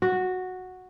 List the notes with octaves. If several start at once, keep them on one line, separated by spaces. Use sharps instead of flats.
F#4